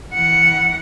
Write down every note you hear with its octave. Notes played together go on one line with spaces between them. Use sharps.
E3 F#5